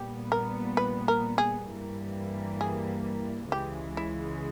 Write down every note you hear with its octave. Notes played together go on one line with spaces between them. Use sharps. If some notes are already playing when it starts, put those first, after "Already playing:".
Already playing: A#1 A#2 G3 B3 G4
A#4
B4
A#4
G#4
G2 E3 G3 A#3
G#4
C#2 C#3 E3 G#3 G4
E4